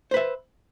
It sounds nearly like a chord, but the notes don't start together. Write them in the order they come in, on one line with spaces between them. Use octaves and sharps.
C5 B4 E5